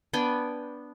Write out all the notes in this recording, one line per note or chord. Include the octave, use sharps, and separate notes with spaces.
B3 D4 G5 G#5